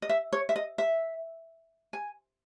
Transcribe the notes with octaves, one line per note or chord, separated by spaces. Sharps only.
D#5
E5
C#5
E5
D#5
E5
G#5